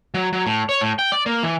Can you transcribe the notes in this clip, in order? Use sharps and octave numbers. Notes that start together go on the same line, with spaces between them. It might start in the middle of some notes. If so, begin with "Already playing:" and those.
F#3
F#3
A2
C#5
A2
G5
D5
A#3
E3